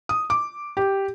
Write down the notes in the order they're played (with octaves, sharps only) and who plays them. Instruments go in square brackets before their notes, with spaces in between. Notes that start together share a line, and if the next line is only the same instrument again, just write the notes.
[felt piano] D#6
D6
G4